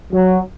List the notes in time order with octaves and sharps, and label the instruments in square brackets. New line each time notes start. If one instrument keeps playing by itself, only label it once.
[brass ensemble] F#3